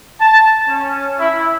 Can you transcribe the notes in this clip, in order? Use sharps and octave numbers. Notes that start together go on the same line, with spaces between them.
A5
C#4
E4